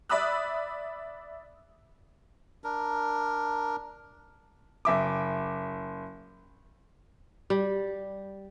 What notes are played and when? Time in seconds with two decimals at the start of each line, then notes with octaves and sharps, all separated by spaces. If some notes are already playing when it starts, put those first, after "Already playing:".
0.09 D5 E5 B5 D#6 E6 F#6
2.64 D4 A#4
4.85 F#1 E5 D6
7.50 G3